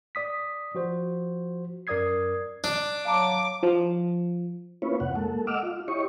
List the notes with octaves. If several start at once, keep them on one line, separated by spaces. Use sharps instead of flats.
D5 D#6 B6
F3 F#4 C5
F#2 A#4 D5 D#6 G#6 C7
D4
F#3 F5 A5 A#5 D6
F3
A#3 C#4 E4 F4 B4 C#5
F2 C3 F#5
G#3 A#3 A4
D#5 F#5 D6 E6 F6
F4
E4 G4 C#5 D#5 C#6